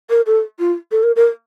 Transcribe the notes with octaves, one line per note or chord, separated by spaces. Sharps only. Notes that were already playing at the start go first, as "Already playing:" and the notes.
A#4
A4
F4
A4
A#4
A#4